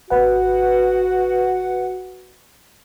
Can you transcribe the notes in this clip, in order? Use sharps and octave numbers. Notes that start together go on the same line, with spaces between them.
G#1 F#4 B4 F#5